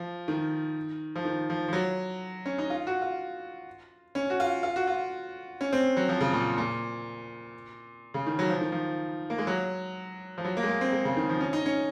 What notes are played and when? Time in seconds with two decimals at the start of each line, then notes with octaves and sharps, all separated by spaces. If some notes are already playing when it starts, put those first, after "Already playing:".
Already playing: F3
0.28 D#3
1.15 F3
1.25 D#3
1.50 F3
1.68 F3
1.73 F#3
2.46 C#4
2.58 D#4
2.70 F4
2.87 F#4
3.02 F4
4.15 C#4
4.30 F#4
4.40 F4
4.63 F4
4.76 F#4
4.87 F4
5.61 C#4
5.73 C4
5.97 F#3
6.09 F3
6.21 C#3
6.33 A#2
6.58 A#2
8.14 C#3
8.26 D#3
8.39 F#3
8.50 F3
8.61 D#3
8.72 F3
9.30 A#3
9.38 G#3
9.47 F#3
10.38 F3
10.44 F#3
10.57 A#3
10.63 G#3
10.68 A#3
10.81 C4
10.92 G#3
11.05 C#3
11.17 D#3
11.29 F3
11.40 C#4
11.53 D#4
11.66 C#4